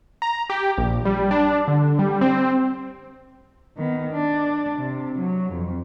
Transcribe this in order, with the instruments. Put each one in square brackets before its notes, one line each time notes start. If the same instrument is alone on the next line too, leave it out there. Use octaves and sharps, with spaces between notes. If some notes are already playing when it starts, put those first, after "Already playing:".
[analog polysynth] A#5
G4
A#1
G3
D4
D3
G3
C4
[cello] D#3 B3
D4
C3
F#3
F2